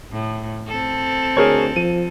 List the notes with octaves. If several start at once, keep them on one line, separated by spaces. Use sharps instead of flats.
A2
C4 A4
D2 G#4 A#4 C#5
F3 D#7